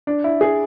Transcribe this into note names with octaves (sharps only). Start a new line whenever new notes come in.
D4
E4
G#4